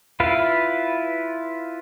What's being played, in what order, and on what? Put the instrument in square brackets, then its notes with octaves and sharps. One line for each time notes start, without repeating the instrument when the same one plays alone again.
[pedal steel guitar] E4 F4 B4 F5